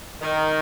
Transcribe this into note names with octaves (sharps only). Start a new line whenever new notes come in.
D#3